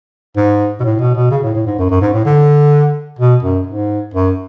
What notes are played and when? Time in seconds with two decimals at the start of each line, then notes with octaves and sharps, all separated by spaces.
0.37 G#2
0.80 B2
0.84 A2
1.00 B2
1.15 B2
1.31 C#3
1.43 A2
1.55 A2
1.67 G#2
1.79 F#2
1.90 F#2
2.02 G#2
2.14 A2
2.25 D3
3.19 B2
3.43 F#2
3.67 G#2
4.14 F#2